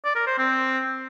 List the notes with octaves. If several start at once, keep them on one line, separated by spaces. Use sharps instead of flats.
D5
A#4
C5
C4